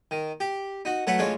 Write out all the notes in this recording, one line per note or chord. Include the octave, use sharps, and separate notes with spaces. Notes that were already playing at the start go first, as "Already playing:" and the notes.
D#3
G4
D#4 F#4
F#3 A3 A4 B4 F#5
A1 G#3 D4 F4 C#5 F5